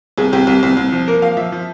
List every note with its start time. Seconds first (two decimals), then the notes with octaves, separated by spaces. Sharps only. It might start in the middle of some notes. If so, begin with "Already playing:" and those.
0.18 C2 G#4
0.32 C2 G4
0.47 C2
0.63 C2
0.77 C2
0.92 F3
1.07 A#3 A#4
1.22 F3 F5
1.37 F3 E5
1.52 F3